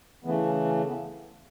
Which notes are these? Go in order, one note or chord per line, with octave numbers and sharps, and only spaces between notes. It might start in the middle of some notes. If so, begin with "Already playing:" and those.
C#3 E3 A3 B3
C#4
C#4
B3